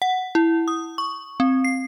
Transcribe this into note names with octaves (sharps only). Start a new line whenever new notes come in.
F#5
E4
D#6
C#6
C4
C7